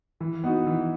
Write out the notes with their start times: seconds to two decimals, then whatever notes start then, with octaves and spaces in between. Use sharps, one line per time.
0.20 E3
0.44 B3 D#4 F#4
0.66 E3